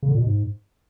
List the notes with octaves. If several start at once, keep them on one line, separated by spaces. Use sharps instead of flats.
C#3
D3
A#2
B2
G#2